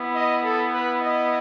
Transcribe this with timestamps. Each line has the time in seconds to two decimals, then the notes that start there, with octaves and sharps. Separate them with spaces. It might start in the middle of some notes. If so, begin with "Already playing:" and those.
Already playing: B3 E4
0.14 D#5
0.43 A4
0.72 B4
1.01 D#5